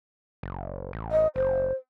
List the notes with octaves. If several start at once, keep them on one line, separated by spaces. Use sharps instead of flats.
F#1
A1
D#5
F#1 C5